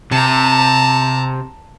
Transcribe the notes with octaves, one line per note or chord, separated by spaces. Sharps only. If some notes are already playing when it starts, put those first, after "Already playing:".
C3 A5 A#5